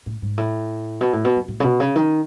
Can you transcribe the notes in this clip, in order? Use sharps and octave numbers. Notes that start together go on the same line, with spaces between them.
A2
G#2
A2
B2
A2
B2
F#2
A2
C#3
B2
C#3
D#3